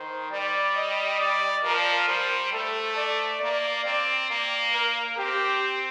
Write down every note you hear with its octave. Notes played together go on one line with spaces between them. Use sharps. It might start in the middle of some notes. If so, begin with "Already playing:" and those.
Already playing: D#3 C5
G3 D5
D#5
D5
F3 A#4
G3 C5
A3 A4
D5
A#3 D5
C4 D5
A#3
A#4
C4 G4